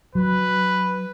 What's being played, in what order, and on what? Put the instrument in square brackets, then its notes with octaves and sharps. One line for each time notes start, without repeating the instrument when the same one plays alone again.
[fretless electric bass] F#3 [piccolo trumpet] B4